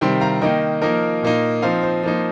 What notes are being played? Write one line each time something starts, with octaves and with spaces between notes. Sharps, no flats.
C3 D#3 G3 C4 G5 C6
F5 A#5
D#3 A#3 D#4 D#5 G5
F3 A#3 D#4 A#4 D#5
A#2 A#3 D#4
F3 C4 D#4 C5 F5
C5
F3 A#3 D#4